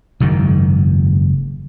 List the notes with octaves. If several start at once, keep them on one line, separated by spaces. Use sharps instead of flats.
F#1 G#2 D#3